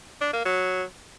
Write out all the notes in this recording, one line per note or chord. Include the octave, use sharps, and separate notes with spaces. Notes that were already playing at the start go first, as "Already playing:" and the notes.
D4
A#3
F#3